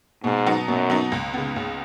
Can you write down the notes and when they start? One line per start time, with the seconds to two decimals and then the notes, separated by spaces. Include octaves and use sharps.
0.24 G#2 B2
0.46 F#3 B3 D#4
0.68 F#2 B2
0.90 F#3 B3 D#4
1.12 C#2
1.34 C#3 B3
1.56 C#2